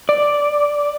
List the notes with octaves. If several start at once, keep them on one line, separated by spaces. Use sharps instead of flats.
D5